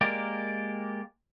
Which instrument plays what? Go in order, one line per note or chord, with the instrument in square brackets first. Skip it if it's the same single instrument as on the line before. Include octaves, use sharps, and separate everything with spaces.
[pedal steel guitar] G#3 A#3 G4 A#4 D5